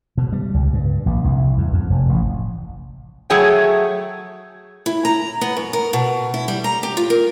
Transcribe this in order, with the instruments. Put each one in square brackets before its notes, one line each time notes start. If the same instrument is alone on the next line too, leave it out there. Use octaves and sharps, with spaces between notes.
[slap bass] B2
G3
C#2
G2
A#1
C2
E2
F2
F1
A1
[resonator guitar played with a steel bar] F#3 A3 G#4 C#5 G5
[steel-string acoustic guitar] E4
A#5
B3
F#2
A#4
B2
E4
G3
A#5
G4
F4
A#4